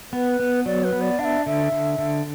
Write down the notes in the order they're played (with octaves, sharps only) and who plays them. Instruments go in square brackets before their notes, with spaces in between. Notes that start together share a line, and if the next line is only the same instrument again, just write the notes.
[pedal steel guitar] B3 [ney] B4
[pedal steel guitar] B3
[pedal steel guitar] F#3 [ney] D5
[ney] B4
[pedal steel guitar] B3
[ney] D5
[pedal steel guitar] D4 [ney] F#5
[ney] E5
[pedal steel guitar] D3 [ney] E5
[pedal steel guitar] D3
D3